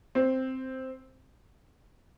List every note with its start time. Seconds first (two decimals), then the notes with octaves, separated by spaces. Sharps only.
0.15 C4